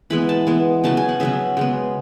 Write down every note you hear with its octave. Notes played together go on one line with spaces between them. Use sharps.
E3 G#3 B3 B5
A5
E3 G#3 B3
C#3 F#3 B3 A5
G#5
F#5
C#3 F#3 B3 E5
C#3 G#3 B3